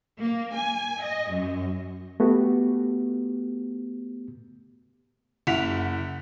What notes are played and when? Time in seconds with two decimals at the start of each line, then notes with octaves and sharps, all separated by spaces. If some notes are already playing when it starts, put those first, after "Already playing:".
0.18 A#3
0.54 G#5
1.01 D#5
1.33 F#2
2.20 A3 B3 F#4 G4
5.47 F#1 E4 F#5 B6 F7